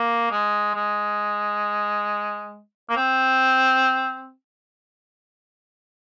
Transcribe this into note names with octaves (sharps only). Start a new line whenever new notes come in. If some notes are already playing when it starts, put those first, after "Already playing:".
Already playing: A#3
G#3
G#3
A#3
C4